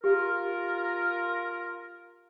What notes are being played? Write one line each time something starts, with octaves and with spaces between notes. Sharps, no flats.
F4 G4 A#4